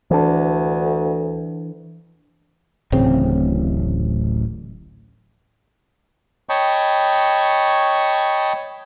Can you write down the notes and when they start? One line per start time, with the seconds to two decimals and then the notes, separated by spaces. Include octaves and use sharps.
0.11 D2 E3 D4
2.92 D1 A1 C#3 C4
6.49 C#5 D#5 G5 A5 B5 C#6